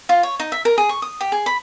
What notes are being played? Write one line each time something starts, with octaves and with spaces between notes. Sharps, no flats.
F4
C#5
D#4
E5
A#4
G#4
C#6
D#6
G4
G#4
B5